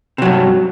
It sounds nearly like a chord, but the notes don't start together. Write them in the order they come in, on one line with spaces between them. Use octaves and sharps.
C3 F#3 G2